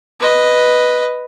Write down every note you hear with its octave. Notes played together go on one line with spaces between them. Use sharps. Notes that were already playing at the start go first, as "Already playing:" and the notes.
B4 D#5